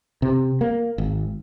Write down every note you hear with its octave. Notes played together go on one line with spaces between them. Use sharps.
C3
A#3
G#1